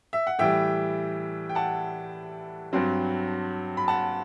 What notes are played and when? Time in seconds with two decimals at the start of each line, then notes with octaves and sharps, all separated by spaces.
0.13 E5
0.27 F#5
0.39 A2 E3 G3 E5 G5
1.49 G5
1.55 F#5 A5
2.73 G2 F#3 C4
3.77 B5
3.88 F#5 A5